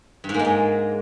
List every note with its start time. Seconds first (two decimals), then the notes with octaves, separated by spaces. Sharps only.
0.24 G2
0.29 G#2
0.34 A#3
0.39 G#3
0.45 G#2